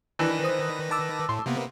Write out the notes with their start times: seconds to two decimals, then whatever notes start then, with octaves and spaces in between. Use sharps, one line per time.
0.19 D#3 E3 D4 B4 A#6
0.44 C5 D#6
0.91 A5 D6 E6
1.29 A2 C6
1.46 C3 A#3 B3